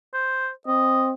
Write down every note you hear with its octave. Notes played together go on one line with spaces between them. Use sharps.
C5
C4 D#5